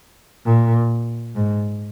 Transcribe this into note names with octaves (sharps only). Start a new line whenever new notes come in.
A#2
G#2